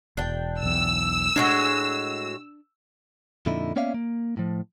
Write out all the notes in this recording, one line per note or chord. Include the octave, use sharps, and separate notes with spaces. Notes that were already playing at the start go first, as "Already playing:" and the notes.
E1 D4 G5
B1 E2 E6
A2 G#3 D4 F#4
F2 A#2 D3 D#4 E4
A#3 B3 C#4 D5 E5 F5
A#3
A2 F3